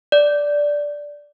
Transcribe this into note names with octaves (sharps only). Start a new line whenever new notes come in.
D5